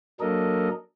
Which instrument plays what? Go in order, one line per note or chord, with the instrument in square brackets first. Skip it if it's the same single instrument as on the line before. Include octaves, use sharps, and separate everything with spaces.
[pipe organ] F#3 A#3 D4 A4 A#4 D#5